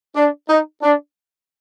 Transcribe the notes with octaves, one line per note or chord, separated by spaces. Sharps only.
D4
D#4
D4